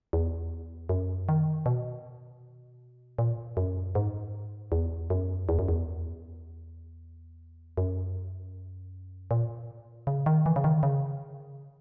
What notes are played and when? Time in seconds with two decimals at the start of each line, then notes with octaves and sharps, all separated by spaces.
0.13 E2
0.89 F#2
1.29 D#3
1.66 B2
3.19 A#2
3.57 F#2
3.95 G#2
4.72 E2
5.10 F#2
5.49 E2
5.59 F#2
5.68 E2
7.77 F#2
9.31 A#2
10.07 C#3
10.26 D#3
10.46 E3
10.56 C#3
10.64 D#3
10.83 C#3